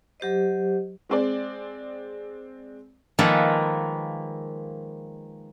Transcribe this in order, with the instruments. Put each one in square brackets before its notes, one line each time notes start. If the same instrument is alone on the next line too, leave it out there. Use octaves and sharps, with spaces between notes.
[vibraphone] F#3 G4 C5 D#5
[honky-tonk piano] G#3 C4 D5
[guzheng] D#3 F3 G#3 A#3 A4 B4